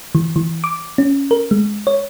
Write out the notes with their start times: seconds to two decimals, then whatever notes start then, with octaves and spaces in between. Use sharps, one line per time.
0.15 E3
0.36 E3
0.64 D6
0.98 C#4
1.31 A#4
1.51 G#3
1.87 C#5